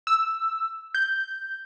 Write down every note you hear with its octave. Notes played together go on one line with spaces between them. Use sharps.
E6
G6